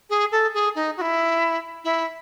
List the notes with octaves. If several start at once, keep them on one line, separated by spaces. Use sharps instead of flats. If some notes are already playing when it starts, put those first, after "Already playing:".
G#4
A4
G#4
D#4
F#4
E4
E4